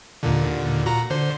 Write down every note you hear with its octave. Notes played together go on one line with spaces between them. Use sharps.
D#2 A#2 D3
A#2 F#4 A#5
D3 C5